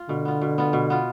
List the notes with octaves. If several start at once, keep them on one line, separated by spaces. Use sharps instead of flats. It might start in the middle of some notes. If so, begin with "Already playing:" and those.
Already playing: F4
B2 D3
B3 F4
B2
B3 F4
B2
B3 F4